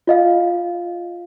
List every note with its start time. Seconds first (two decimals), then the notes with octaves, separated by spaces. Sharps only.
0.07 F4 D#5 F5